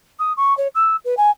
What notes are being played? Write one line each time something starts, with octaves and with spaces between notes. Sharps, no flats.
D#6
C#6
C#5
E6
B4
G#5